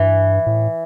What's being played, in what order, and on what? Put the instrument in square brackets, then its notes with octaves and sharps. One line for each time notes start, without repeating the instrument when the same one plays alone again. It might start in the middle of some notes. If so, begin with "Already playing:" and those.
Already playing: [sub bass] G2 [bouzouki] E3
[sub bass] A2